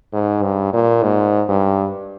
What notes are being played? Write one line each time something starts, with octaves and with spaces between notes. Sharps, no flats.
G#2
G2
A#2
G#2
G2